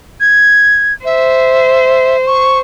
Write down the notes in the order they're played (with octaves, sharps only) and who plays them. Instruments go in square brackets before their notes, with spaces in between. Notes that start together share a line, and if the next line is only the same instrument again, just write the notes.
[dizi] G#6
[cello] C5 [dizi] E5
[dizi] C#6